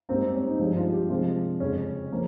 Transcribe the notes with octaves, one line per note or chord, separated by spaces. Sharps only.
G#2 G3 A#3 C4
C4
C#4
D#4
G2 F3 G#3 D#4
F4
G4
C3 F3 G#3 F4
F2 C#3 G#3 C#4
F3 A#3